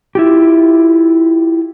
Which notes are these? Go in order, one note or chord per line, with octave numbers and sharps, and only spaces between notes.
E4 F4 G4